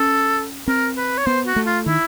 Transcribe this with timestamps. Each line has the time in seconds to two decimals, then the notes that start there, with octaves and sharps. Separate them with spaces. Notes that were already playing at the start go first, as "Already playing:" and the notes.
Already playing: C#4 A4
0.68 C4 A#4
0.97 B4
1.18 C#5
1.26 B3 C5
1.46 F#4
1.56 A3
1.66 F4
1.86 D#3 E4